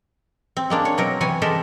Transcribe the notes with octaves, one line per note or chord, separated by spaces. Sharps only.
C4
G#3 A#3 D4
C#5
B2 F#3 C4 A#4
C3 E3 F#3 C#5 G#5
G#3 G4 A4 A#4 C5 E5